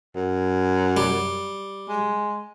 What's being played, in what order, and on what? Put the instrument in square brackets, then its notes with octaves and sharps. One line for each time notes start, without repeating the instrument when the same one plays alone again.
[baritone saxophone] F#2
[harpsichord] G3
[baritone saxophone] G#3